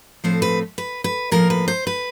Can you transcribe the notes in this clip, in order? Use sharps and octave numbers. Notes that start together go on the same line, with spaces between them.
A2 F3 A3 C4 C5
B4
B4
B4
A2 F3 A#3 A#4
B4
C5
B4